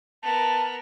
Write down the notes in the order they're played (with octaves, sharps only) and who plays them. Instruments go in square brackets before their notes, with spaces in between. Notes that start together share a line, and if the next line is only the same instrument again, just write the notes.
[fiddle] B3 A#4 [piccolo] A5